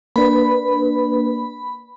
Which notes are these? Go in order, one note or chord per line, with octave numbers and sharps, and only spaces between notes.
A#3 D4 B4 B5